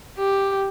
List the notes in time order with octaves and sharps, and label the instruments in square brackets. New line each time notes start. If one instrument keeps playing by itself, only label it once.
[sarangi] G4